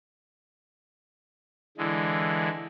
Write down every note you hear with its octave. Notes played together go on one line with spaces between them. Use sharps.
D3 E3 G#3